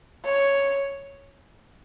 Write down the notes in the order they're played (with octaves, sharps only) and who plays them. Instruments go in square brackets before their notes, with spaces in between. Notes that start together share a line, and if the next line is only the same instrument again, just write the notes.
[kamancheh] C#5